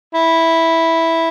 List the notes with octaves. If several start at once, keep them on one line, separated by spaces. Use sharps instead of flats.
E4